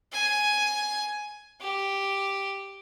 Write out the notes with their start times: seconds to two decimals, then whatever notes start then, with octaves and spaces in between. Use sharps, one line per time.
0.13 G#5
1.61 G4